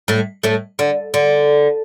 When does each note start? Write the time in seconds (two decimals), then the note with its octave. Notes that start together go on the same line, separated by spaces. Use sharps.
0.08 A2 A3
0.43 A2 A3
0.79 D3
1.14 D3